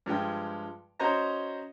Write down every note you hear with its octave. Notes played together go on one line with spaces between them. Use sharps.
G2 F3 G#3 G5
C#4 F#4 C5 C#5 D#5 A#5